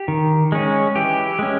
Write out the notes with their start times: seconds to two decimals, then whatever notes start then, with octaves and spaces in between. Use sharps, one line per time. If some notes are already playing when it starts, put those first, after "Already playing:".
Already playing: G4
0.08 D#3
0.52 G#3 C#4
0.95 E3 G4
1.39 G#3 C#4